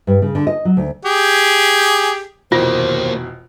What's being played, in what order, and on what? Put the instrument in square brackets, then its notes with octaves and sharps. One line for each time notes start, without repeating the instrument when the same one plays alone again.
[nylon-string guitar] G2
C#3
D3
D#5
F#3
D2
[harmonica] G4 G#4
[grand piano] F1 B2 E3 [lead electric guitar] D#2 A#3 [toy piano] F4 [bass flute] C5